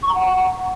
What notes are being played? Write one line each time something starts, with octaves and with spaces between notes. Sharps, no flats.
C#6
A#5
F#5